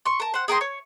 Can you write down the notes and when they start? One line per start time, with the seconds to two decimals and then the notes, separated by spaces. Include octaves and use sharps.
0.06 C6 C#6
0.20 A#4 A5
0.34 C5 F#5
0.48 G#4 A#4 G5 C6
0.61 C#5